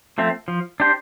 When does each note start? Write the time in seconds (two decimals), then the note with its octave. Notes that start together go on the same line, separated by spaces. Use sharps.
0.18 F3 A3 C4
0.48 F3
0.80 D4 G4 C5